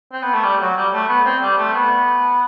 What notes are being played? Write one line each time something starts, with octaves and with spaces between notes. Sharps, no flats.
C4
B3
A3
G3
F#3
G3
A3
B3
C4
G3
A3
B3